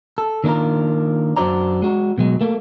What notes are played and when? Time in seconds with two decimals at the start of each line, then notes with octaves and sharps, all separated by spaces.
0.18 A4
0.44 D#3 A#3 D4 F4 A#4
1.37 F#2 D4 F#4 C5 D5 A#5
1.82 G#3 F#4
2.18 B2 F#3 G#3
2.41 A3 A#3